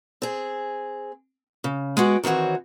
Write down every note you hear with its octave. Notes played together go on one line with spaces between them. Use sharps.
C4 G#4
C#3
G#3 B3 F#4 G5
D#3 E3 C4 F#4 C#5